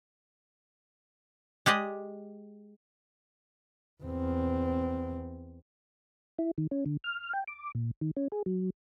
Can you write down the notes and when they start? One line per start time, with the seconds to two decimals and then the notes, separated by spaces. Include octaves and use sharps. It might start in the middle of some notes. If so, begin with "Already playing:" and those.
1.66 G#3 G4 D5 D#5
4.03 E2 C4
6.39 E4
6.58 D#3
6.71 C#4
6.86 D3
7.04 F6
7.33 G5
7.48 D6
7.75 A#2
8.01 D#3
8.17 C#4
8.32 G#4
8.46 F#3